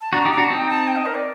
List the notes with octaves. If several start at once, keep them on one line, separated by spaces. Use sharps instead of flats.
A5
D4 F#4 A#5
D#4 G4
A#5
D4 F#4
A5
C4 D#4
G5
A5
G5
D#5
A#4
D5